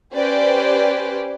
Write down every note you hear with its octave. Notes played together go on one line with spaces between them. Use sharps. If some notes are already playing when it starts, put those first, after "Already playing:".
C#4 G4 B4 C5 D5